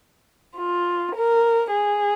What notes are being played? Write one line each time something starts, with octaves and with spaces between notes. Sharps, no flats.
F4
A#4
G#4